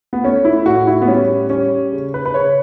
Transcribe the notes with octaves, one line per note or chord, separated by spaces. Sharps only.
B3
A3 C#4
E4
A2 F#4
E4
B3
G3 C#4
G3 C#4
C#3
B4
B4
C#3 C#5